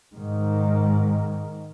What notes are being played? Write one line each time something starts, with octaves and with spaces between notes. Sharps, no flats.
G#2 D#3